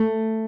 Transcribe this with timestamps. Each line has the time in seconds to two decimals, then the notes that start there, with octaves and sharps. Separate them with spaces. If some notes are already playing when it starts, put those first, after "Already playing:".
Already playing: A3